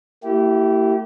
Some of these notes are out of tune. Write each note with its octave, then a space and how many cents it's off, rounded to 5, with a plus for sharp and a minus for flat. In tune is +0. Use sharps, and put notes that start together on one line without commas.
A#3 -40 E4 +0 G4 -25